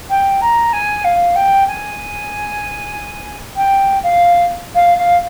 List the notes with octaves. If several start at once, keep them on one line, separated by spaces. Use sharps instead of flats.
G5
A#5
G#5
F5
G5
G#5
G5
F5
F5
F5